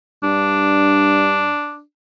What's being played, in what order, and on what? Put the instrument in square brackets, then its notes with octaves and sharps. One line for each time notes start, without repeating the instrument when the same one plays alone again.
[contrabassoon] G2 [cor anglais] D4